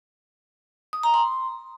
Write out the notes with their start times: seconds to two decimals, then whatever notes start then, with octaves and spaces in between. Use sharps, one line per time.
0.93 D#6
1.03 A#5
1.14 C6